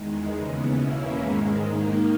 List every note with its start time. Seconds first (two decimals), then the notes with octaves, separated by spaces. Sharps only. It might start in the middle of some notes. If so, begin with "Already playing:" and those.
Already playing: E2 D#3 G#3
0.33 D#2 C#3 E3 B3
0.76 E2 B2 A#3 C#4 E4
1.19 G#2 D#3 G#3
1.62 D#3 A#3 D#4